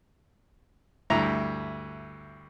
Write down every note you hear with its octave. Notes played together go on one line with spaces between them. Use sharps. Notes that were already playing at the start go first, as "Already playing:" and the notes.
D2 G2 E4 A#5